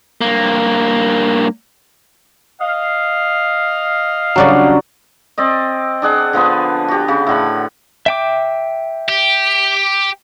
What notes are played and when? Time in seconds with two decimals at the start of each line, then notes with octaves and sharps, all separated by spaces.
0.21 G2 A#3
2.61 D#5 F5
4.36 C#3 F#3 G3 D4 F#4 D5
5.38 C4 D5 D#5
6.02 D4 G#4 F#5
6.33 D3 F3 B3 B4
6.88 F#4 G4
7.08 C#3 F#4
7.27 A2 D3 B5
8.06 E5 G5 D6
9.09 G4